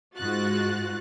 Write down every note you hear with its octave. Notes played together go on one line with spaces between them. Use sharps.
G#2 F4 F#4 F#6 A6